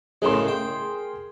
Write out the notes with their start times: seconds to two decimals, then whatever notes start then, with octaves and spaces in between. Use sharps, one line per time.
0.22 A2 C#3 G#3 G#4 A#4 C6
0.48 G5